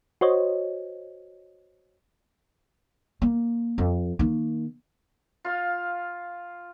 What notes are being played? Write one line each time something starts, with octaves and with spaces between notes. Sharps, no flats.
F#4 C5 C#5 D#5
A#3
F2
D#3 A#3
F4 F5